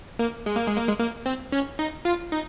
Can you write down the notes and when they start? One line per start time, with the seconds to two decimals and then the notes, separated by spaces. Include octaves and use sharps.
0.19 A#3
0.46 G#3
0.56 A#3
0.67 G#3
0.77 A#3
0.88 G#3
0.99 A#3
1.26 C4
1.52 C#4
1.79 D#4
2.05 F4
2.32 D#4